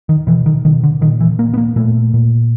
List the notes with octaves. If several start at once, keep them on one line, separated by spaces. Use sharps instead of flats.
D#3
B2 E3
D#3
B2 D#3
D3
A#2 D#3
E3
A#2 A#3
B3
A#3
A#2 A3
A#2